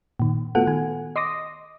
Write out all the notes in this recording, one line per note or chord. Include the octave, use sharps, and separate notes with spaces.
A#2 D#3
A3 B3 F4 F#4 A4 F#5
D#3 G#5
D#5 C6 D6 D#6 A#6